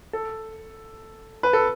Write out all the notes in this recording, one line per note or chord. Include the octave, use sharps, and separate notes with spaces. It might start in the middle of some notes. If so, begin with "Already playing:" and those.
A4
B4
A4